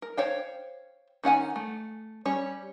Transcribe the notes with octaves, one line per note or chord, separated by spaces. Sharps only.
A#4
C5 C#5 F5 G5
D#3 C#4 F#5 G#5
A3
G3 C#4 C#5